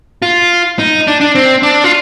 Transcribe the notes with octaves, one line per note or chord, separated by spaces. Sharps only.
F4
D#4
D4
D4
C4
D4
F4